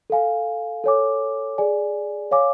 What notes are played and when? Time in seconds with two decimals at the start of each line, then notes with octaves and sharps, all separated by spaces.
0.10 A4 F5 G#5
0.84 A4 C#5 G#5 D6
1.58 G#4 D5 G#5
2.31 C#5 F5 G#5 D6